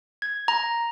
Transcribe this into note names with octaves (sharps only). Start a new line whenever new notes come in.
G#6
A#5